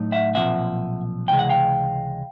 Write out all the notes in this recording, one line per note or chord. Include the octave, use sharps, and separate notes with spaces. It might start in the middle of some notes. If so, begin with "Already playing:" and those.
Already playing: A2 F#3 D#4
E5 F#5
B1 A#2 F3 C4 E5 F#5
C#2 C3 E3 G#3 G5
F#5
F5 G5